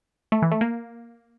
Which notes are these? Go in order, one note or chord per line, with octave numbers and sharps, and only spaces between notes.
A3
E3
A3
A#3